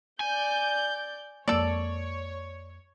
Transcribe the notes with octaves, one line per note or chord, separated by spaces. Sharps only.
D5 G#5 G6
F2 G#3 A#3 A4 C#5 D5